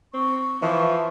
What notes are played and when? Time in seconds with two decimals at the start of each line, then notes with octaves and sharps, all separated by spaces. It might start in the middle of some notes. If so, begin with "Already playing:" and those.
0.14 C4 C#6
0.62 E3 F3